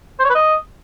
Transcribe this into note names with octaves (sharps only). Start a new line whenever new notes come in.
C5
C#5
B4
D#5